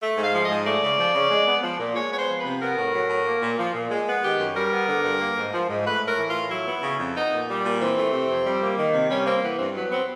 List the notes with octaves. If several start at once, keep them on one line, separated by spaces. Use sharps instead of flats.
A3
G#2
F5
F3
G#2 D#5
A3 D5
C#3
F3
C#3
G#3
B3
F3
A#2
G#3 C#5
B3 C#5
C5
F3
B4
C3
B3 A#4
A2
F#3
A2
A#3
A#2
F3
A#2
G#3
B3
D#3 G4
F#2
G3 A#4
B3
D3
G2
A#3
G#2
F3
G#2
A3 B4
A2
A#4
E3
A2 F4
F#3 E4
B3
C#3
F2
B3 D#4
A#2
G3
A#2
E3 C4
A3
C3
F2
G3
A#3
D#3
C3
G3 C#4
A#3 C4
E3 B3
G2 C4
F#3 B3
B3 C4